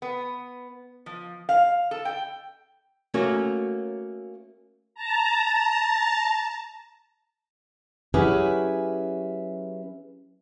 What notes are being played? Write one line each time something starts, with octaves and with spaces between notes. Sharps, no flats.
B3
F3
F5
A4
G5
A3 A#3 C#4 F#4
A5 A#5
F#3 C#4 E4 G4 G#4 B4